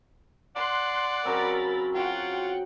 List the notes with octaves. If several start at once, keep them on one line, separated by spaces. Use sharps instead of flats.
D5 F#5 C6 F#6
C#3 F#3 C4 A#4 B5 A6
F4 F#4 F#5 G5